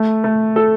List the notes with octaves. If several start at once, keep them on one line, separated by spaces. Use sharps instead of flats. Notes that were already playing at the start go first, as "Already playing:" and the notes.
Already playing: A3
A3
A4